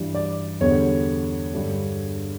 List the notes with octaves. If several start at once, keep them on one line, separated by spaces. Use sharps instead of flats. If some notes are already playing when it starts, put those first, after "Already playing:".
Already playing: G2 E3 G3
D5
E2 D3 G3 C#5
G2 D3 G3